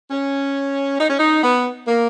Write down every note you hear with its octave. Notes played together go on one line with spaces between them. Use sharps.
C#4
D#4
C#4
D#4
B3
A#3